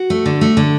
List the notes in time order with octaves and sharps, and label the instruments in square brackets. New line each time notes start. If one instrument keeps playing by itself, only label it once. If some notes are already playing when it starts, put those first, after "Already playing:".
Already playing: [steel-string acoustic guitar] F#4
A3
D3
A3
D3